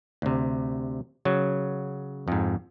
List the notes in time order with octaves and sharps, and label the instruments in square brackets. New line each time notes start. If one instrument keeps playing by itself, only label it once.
[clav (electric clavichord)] D2 C3
C#3 F#3
F2 G#2